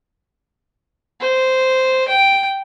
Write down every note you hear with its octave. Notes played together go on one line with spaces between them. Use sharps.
C5
G5